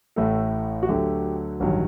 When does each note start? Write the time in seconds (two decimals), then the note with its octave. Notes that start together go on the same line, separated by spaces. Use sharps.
0.16 A1 A2 A3 A4
0.83 F#4
0.89 D2 D3 F#3 A3 G4
1.60 A1 G2 D#3 F#3